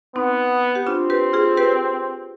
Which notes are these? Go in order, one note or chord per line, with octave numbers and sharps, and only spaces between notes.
B3 C4 D#4
G4
C4 D4 F4
G4 B4
F4 G#4
G4 B4